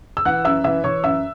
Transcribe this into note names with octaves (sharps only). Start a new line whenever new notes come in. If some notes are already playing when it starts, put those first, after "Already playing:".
E6
E3 F#5 F#6
F#2 E5 E6
E3 E5 E6
E3 C#5 C#6
F#2 E5 E6